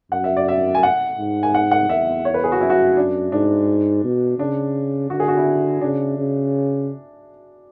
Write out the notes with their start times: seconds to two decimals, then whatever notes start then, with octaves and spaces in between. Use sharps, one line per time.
0.12 F#2 F#5
0.24 E5
0.37 D5
0.48 E5
0.75 G#5
0.83 F#5
1.19 G#2
1.43 G#5
1.55 F#5
1.71 F#5
1.89 E2 E5
2.25 C#5
2.34 B4
2.44 G#4
2.52 F#4
2.61 F#2 E4
2.70 F#4
2.97 D4
3.32 G#2 D4
4.04 B2
4.39 C#3 D4
5.10 D3 F#4
5.20 G#4
5.28 F#4
5.37 E4
5.81 C#3 D4
6.18 C#3